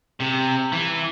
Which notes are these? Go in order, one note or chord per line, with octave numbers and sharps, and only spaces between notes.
C3
E3